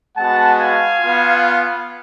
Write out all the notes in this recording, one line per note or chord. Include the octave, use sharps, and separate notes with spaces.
G#3 B3 F#4 F#5 A5
F5 G#5
B3 F4